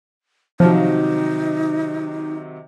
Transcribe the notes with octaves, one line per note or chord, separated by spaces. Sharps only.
C3 D#3 F3 F#3 D#4